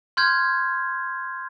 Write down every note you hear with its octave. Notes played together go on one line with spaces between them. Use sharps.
C6 F6 G6 G#6